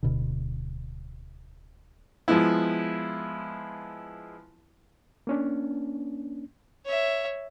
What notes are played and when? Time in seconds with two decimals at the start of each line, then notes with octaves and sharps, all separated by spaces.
0.03 D1 B2 D3
2.28 F3 G#3 B3 E4
5.27 A#3 C#4 D4
6.85 C#5 E5